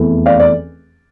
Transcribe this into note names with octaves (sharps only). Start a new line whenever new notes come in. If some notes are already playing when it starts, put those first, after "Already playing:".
Already playing: F1 E2 E3 A3
D5 F5
D5